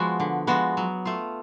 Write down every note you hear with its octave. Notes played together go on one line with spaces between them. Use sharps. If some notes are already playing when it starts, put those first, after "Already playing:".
Already playing: F3 G#3 B3 F#4
D3
F3 G#3 B3 F#4
F#3
A3 F4